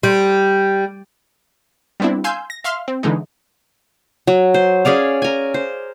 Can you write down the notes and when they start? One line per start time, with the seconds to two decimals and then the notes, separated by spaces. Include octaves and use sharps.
0.03 G3
2.00 G3 B3 C4 D4 E4
2.24 F5 G#5 C6 E6 G6
2.50 A#6
2.64 E5 F5 C6 F6
2.88 C4
3.03 D3 E3 G#3 D#4
4.27 F#3
4.54 C5
4.85 C#4 G#4 D5 F5
5.22 A#4 G#5
5.54 C5